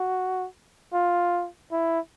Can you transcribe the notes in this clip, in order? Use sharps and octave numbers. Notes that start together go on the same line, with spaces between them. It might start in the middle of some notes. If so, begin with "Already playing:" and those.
Already playing: F#4
F4
E4